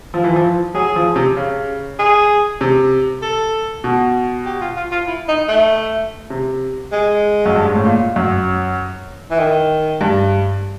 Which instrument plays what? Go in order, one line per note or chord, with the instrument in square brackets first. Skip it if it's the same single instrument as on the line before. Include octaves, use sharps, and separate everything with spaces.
[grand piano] F3
E3
F3
[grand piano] F#3 [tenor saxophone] G#4
[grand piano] F3
C3
C#3
[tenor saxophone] G#4
[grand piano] C3
[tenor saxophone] A4
[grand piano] B2
[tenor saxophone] G4
F4
F4
F4
E4
D#4
A3
[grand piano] C3
[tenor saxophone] G#3
[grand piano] F#2
G2
G#2
A2
A#2
F#2
[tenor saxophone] E3
D#3
[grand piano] G2